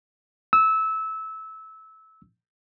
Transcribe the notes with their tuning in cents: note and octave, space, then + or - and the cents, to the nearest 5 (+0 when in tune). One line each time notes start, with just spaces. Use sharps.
E6 -20